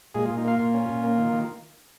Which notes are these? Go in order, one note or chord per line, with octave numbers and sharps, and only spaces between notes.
A#2 G#3 G#4
A#2 F4
D#4
A#3 F4 F5
A#2 F4
C#4
A#2
A#3
D#3
D#3